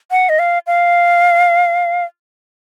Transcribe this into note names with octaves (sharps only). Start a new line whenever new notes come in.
F#5
D#5
F5
F5